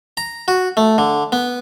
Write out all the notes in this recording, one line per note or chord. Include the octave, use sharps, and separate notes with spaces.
A#5
F#4
A3
D3
B3